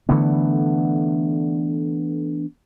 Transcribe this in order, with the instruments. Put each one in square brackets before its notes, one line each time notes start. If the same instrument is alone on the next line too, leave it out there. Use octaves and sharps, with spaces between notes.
[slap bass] D3 E3 A3 B3